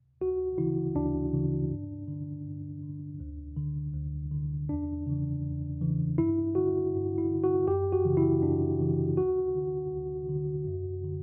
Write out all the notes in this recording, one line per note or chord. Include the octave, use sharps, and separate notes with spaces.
D2 F#4
C#3 E3 E4
D2 D4
C#3 E3
G2
D3
G2
D3
D2
D3
D2
D3
E2 D4
C#3 E3
E2
C#3 E3
G2 E4
D3 F#4
G2
E4
D3
F#4
F#2 G4
F#4
C#3 E3
E4
F#2 D4
C#3 E3
D2 F#4
D3
D2
D3
F#2
D3